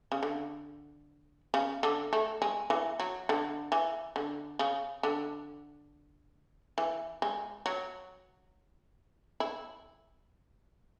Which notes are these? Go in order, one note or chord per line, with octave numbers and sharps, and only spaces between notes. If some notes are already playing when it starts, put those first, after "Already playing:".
C#3
D3
C#3
D3
A3
G#3
E3
F#3
D3
E3
D3
C#3
D3
E3
G#3
F#3
E4